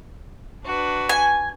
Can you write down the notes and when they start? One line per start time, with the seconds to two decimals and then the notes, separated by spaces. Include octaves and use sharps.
0.66 D4 F#4 B4
1.09 G#5